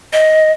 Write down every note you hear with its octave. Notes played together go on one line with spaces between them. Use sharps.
D#5